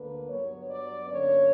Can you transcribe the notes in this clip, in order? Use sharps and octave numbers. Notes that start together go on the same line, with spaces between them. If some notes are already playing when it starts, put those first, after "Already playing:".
Already playing: D2 D3 A#3 B4
G2 F#3 B3 C#5
D5
G2 D3 F#3 A#3 C#4 C#5